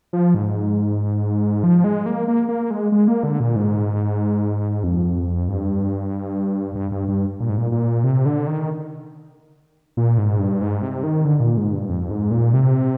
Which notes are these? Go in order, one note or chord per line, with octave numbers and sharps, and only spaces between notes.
F3
G#2
F3
G#3
A#3
A#3
A#3
G#3
G#3
A#3
D3
A#2
G#2
F2
G2
G2
G2
G2
A#2
G#2
A#2
A#2
C3
D3
D#3
A#2
G#2
G2
G#2
C3
D#3
D3
A#2
G#2
G2
F2
G#2
A#2
C3